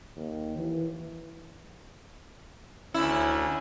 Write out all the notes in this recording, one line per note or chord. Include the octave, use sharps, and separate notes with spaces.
D#2
E3
D2 C#4 E4 G#5